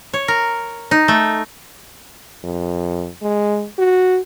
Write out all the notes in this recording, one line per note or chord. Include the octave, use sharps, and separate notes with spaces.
C#5
A#4
D#4
A3
F2
G#3
F#4